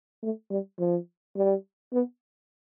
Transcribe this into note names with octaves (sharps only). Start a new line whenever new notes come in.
A3
G3
F3
G3
B3